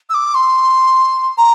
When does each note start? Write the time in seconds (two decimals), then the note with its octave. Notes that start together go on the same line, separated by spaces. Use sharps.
0.09 E6
0.14 D6
0.34 C6
1.38 A#5